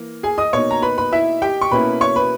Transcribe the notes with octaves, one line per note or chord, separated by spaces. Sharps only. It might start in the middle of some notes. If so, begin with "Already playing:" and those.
Already playing: E3 A#3
G#4 G#5
D#5 D#6
B2 A#3 D#4 C#5 C#6
A#5
B4 B5
B4 B5
E4 E5
G4 G5
C#6
B2 A#3 C#4 E4 B4 B5
C#5 C#6
B4 B5